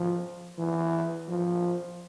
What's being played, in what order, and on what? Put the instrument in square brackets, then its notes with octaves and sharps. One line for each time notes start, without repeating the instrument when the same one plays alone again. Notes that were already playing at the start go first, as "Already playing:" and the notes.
Already playing: [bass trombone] F3
E3
F3